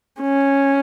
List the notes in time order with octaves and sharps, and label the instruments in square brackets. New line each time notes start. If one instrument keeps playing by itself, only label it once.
[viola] C#4